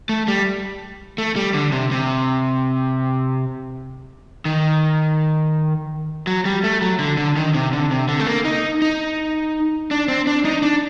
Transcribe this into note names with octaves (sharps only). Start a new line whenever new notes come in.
A3
G3
A3
G3
D3
C3
C3
D#3
F#3
G3
A3
F#3
D3
D3
D#3
C3
D3
C3
D3
A3
A#3
D#4
D#4
D4
C4
D4
D#4
D4